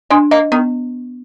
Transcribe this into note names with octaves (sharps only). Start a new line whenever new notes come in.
G#3 D4
A#3 D#5
D#3 B3